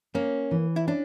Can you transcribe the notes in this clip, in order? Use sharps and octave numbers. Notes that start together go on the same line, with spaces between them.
A#3 C#4
E3
E4
C#4 D4